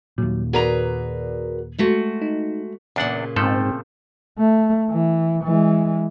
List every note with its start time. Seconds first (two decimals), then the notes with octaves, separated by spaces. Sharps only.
0.18 D#2 A#2 F#3
0.53 F#4 G#4 A#4 B4 D5 A#5
1.78 G#3 A3 F#4
2.22 D#4
2.96 E2 A#2 C#3 D4 F#5
3.36 G#2 F3 A3 C4 A4
4.39 A3
4.91 E3
5.44 E3 G#3